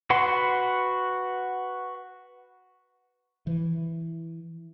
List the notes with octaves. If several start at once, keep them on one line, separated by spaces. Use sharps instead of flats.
F#4 B4 F#5 C6
E3